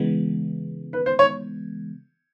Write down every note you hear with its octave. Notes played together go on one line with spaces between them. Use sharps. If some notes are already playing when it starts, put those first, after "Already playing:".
Already playing: C#3 E3 G#3 B3
B4
C5
C#5